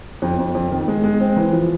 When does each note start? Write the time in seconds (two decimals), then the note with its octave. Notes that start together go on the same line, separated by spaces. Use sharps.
0.22 F2
0.39 F2
0.55 F2
0.72 D#3
0.88 G#3
1.04 G#3
1.20 C4
1.37 E3
1.53 F3